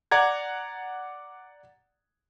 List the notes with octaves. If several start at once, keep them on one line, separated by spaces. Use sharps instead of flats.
D5 F#5 A#5 G#6